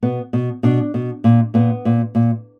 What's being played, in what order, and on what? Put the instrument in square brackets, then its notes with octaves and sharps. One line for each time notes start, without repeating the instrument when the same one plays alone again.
[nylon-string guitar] B2 B3
B2
B2 D4
B2
A#2
A#2 B3
A#2
A#2